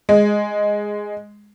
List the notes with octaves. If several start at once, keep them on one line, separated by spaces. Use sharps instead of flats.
G#3